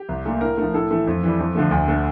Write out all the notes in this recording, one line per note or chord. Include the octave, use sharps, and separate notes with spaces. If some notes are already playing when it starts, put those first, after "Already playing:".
Already playing: G4
C2
A#2 A3
A2 A#4
F3 A3
A2 A4
E3 A3
F2
E3 G3
F2
D3 F3 A3
D2
D3 A3